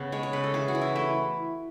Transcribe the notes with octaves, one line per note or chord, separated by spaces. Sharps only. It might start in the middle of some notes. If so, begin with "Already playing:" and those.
Already playing: C#3 B3
G#3 C#5
C#5
C#3 B4
A4
E3 G#4
F#4
E3
E4
A3 E4